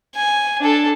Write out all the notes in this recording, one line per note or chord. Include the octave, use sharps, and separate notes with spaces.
G#5
D4 A4